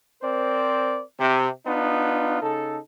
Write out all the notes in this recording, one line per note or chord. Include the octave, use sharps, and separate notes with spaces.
C4 A#4 C5 D5
C3
B3 D4 D#4 F4
C#3 D#4 A4